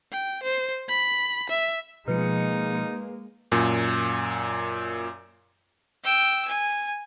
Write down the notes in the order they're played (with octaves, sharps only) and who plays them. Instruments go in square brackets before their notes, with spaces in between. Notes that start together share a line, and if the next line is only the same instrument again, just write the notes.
[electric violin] G5
C5
B5
E5
[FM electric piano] B2 F3 C#7 [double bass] G#3 A#3 [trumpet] D#4 [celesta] B4
[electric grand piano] F#2 A#2
[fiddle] G5 E6
G#5